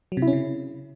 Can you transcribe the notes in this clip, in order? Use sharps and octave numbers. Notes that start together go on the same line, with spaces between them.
F#3
C3
E4
C#4
C#3